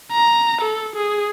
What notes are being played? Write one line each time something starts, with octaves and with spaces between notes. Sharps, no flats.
A#5
A4
G#4